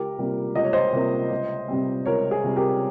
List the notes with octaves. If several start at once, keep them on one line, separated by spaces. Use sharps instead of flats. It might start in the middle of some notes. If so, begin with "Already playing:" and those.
Already playing: C#2 G4 A#4
C3 G3 A#3
C#2 D#5
C#5
C5 D#5
C3 G3 A#3
C#2
C3 G3 C4
C#2 A#4 C#5
G#4
C3 G3 C4
G4 A#4